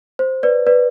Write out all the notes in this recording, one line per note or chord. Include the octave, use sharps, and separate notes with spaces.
C5
B4 D5
B4 D5